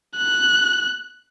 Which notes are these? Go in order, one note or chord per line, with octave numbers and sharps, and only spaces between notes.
F#6